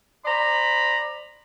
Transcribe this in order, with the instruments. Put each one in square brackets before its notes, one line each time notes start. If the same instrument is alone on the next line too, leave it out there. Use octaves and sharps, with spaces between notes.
[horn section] C5 D5 A#5 B5